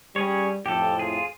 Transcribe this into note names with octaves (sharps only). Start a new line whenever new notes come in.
G3 C#4 G#4 C#5
F2 A2 G4 A4
F4 G#4